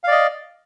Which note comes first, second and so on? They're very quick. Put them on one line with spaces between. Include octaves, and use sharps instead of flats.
F5 D5 D#5